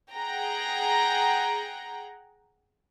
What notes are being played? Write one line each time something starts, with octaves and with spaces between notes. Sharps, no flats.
G#4 F#5 G5 A#5